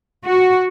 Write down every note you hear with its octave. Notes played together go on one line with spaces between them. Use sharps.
F#4